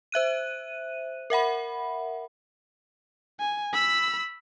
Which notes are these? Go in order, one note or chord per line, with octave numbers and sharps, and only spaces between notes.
C5 E5 F#6 D#7
A#4 E5 F#5 B5
G#5
B5 E6